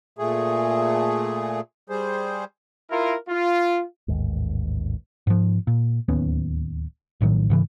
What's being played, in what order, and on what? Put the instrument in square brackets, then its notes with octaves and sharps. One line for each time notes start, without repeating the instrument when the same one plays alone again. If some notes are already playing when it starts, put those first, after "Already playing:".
[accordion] A#2 A3 G#4
G3 G#4 C5
[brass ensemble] E4 F4 A#4
F4
[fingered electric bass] A1 D#2 G#2
[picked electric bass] G#2 F3
A#2
D1 D#2 B3 C#4
A#1 A2 D#3 F#3
G#2 C#3 E3